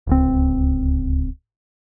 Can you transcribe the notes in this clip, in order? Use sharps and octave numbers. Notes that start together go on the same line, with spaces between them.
D1 C#2 C4